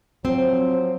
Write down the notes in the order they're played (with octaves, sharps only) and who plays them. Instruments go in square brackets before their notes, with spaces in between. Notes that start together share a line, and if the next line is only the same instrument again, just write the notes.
[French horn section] F3 F#3 C5 [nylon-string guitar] C4